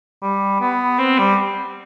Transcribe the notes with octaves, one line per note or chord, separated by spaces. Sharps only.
G3
B3
C4
G3